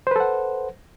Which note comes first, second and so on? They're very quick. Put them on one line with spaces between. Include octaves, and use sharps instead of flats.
C5 B4 A4 F#5